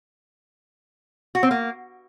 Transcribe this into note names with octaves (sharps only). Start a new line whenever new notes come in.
F#4
C4
A#3